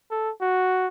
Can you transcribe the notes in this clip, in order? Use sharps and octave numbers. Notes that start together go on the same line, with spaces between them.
A4
F#4